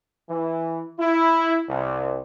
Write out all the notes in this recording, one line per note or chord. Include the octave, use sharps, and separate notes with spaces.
E3
E4
C2